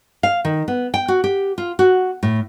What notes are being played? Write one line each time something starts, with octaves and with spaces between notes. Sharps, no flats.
F5
D#3
B3
G5
F#4
G4
F4
F#4
A2